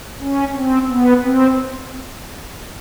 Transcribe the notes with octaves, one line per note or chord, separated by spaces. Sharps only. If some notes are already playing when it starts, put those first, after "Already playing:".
C#4
C4
B3
C4